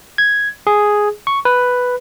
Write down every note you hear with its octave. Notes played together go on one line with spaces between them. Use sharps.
G#6
G#4
C#6
B4